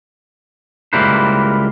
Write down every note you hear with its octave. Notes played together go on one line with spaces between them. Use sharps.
C#2 G3 A#3 E4 B4 C5